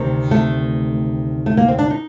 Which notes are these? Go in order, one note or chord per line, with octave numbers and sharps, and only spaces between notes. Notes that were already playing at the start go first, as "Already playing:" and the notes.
Already playing: D2 C3 D#3 C4
A3
A3
A#3
C4
D4
D#4